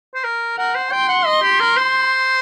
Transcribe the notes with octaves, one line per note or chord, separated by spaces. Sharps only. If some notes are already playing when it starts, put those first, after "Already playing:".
C5
A#4
A#4 F#5
C5
G5 C6
F#5
D#5
G4
A#4
C5